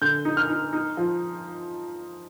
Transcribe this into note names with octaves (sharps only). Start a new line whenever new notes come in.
D3 G6
D#4
F6
D#4
D#4
F3